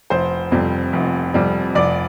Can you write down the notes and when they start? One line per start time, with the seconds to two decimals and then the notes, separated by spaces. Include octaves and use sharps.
0.10 F1 C5
0.52 F2 C3 G3
0.93 F1
1.34 F2 C3 G3
1.75 F1 D5